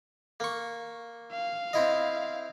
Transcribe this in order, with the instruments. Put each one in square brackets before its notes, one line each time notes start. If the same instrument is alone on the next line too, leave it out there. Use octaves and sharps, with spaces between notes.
[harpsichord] A#3 C#6
[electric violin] F5
[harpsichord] C4 E4 D#5